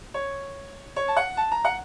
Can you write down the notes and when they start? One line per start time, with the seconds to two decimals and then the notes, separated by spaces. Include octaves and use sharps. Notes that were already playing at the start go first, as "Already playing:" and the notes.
0.14 C#5
0.96 C#5
1.08 A5
1.17 F#5
1.37 A5
1.52 A#5
1.65 F#5